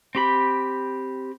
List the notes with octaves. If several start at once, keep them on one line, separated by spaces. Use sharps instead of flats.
C4 G4 B5